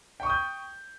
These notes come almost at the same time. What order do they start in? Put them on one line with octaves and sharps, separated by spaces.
G5 C#6 D#6 G6